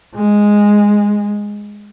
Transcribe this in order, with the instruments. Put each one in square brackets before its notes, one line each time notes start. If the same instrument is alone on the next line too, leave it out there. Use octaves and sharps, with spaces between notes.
[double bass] G#3